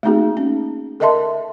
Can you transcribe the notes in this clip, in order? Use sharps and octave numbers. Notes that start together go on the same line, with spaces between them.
A3 A#3 C4 D#4 F#4 G#4
C#4
A4 A#4 D#5 E5 A5 C6